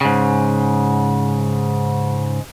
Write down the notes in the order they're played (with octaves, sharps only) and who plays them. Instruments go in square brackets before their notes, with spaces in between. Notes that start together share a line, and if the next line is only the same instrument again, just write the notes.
[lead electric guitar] G#2 C#3